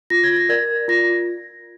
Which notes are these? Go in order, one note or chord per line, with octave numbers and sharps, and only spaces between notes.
F4 A#6
G#6
A#6
A#4 D5 G#6
F4 A#6